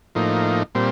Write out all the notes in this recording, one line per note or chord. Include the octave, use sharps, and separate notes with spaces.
A2 F3 A#3 D#4
A#2 G3 C4